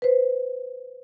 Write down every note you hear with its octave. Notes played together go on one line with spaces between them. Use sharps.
B4 C5